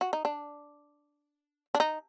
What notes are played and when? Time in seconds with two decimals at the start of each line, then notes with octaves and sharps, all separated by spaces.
0.01 F#4
0.13 D#4
0.25 D4
1.75 D4
1.80 D#4